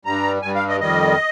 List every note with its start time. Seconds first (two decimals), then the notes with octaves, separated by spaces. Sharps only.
0.05 G2 G3 A#5
0.42 G2 G3 G#5
0.55 F5
0.68 D#5
0.80 F2 D#3 G3 D#5